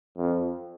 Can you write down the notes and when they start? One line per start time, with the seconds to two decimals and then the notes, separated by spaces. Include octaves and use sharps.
0.17 F2